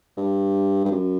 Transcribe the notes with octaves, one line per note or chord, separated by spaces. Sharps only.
G2
G2
F#2